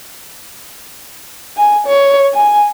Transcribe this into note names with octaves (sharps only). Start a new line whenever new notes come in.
G#5
C#5
G#5